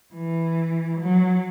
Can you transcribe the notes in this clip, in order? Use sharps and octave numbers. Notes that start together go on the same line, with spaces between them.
E3
F#3